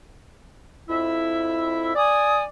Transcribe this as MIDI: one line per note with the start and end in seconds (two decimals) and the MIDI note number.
0.89 1.93 41
0.89 1.93 64
0.89 1.93 76
1.95 2.45 74
1.95 2.44 80
1.95 2.44 87